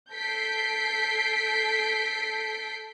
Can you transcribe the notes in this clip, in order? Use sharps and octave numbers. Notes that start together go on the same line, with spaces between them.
A4 G6 B6 C7 D7